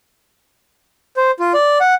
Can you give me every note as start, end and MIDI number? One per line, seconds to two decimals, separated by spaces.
1.17 1.31 72
1.40 1.52 65
1.54 1.78 74
1.81 1.94 78